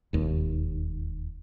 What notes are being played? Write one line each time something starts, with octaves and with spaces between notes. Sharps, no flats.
E1 D#2